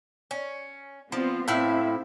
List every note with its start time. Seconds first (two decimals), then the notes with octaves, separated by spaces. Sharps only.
0.31 C#4
1.12 F3 B3 C4 F4
1.48 A2 C4 E4 E5 F5